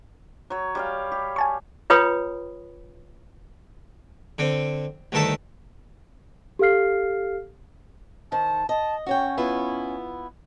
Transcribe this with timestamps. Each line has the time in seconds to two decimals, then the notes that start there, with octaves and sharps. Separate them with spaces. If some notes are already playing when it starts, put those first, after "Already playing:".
0.50 F#3 C#5
0.75 G3 C#5 F5
1.12 G4
1.36 G#5 A5 C#6
1.90 F4 B4 C#5 G5 B5 D#6
4.38 D3 C4
5.12 D2 G2 D#3 A4 E5 A5
6.59 G4 A4 F5 F6 C7
8.32 D#3 C5 A5
8.69 D#5 A5
9.06 C#4 F#4 C#5 G5
9.38 B3 E4 F4